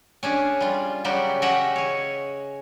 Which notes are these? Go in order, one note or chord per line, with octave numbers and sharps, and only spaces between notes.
C#4 D4 G#4
G3 F4
C#3 F#3 G3 F#4 G4
C#4 F#4 G4 D#5 E5 F#5
G#4 C#5